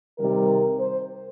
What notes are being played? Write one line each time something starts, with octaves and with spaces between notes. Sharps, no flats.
C3 D#3 G3 A#4
C5